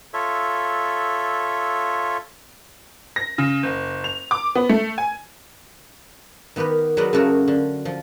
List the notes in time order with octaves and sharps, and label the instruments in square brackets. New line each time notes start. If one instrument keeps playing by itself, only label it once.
[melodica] F4 A4 C#5 E5
[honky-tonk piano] A#6
C#3
F#1
F7
D6
B3
A3
G#5
[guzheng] D#3 B3 G4 A#4 B4
F#3 G#3 F#4 A#4 B4 D5
C#3 A3 C#4 F#4 A4 A#4
D3
F3